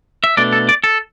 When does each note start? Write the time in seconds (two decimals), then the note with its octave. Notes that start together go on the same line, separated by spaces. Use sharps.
0.24 E5
0.37 B2 A3 D4 D5
0.52 A4
0.69 D5
0.84 A4